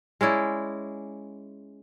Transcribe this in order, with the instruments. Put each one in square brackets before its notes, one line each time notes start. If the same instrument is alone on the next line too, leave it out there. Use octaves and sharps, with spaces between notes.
[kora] G#3 C#4 E4 D5